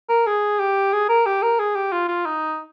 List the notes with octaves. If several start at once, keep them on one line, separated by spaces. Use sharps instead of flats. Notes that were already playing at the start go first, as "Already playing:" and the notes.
A#4
G#4
G4
G#4
A#4
G4
A#4
G#4
G4
F4
F4
D#4